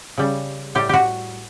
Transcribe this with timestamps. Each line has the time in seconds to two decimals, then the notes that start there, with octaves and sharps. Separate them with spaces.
0.17 C#3 G3
0.75 A2 G3 G4
0.89 F#4 G4